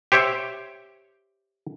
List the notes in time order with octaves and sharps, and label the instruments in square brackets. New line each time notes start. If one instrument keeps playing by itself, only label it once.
[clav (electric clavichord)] G4 C5 C#5 E5 G5